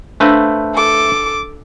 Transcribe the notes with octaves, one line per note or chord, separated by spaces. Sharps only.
A3 D4 B4 C5 F5 E6
A4 D6